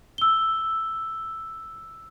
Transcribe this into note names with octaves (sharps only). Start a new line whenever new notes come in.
E6 G7